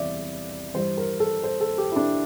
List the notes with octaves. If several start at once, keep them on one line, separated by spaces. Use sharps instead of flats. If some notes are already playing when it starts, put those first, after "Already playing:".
Already playing: E2 C3 E3 G3 D5 E5
G2 E3 G3 C5
A#4
A4
C5
A4
G4
E4
D4